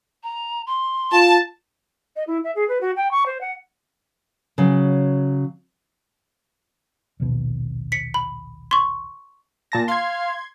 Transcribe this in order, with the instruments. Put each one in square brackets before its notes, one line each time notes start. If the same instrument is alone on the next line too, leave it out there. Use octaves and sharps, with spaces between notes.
[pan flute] A#5
C6
[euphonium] F4 [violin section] A5
[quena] D#5
E4
E5
G#4
B4
F#4
G5
C#6
C5
F#5
[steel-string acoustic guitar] C#3 F#3
[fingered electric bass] A#1 D#2 B2
[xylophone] B6 C#7
B5
C6 C#6
[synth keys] A#2 A5 A#6
[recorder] F5 [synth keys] C6 G#6